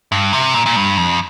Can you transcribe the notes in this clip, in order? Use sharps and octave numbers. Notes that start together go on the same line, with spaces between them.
G2
C3
A#2
A#2
G2
F2